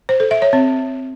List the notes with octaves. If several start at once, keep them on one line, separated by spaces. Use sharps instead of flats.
C5
A4
E5
C#5
C4